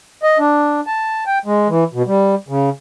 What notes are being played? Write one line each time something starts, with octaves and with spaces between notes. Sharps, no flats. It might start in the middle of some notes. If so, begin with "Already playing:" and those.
D#5
D4
A5
G5
G#3
E3
B2
G3
C#3